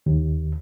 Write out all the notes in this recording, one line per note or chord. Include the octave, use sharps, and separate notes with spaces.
D#2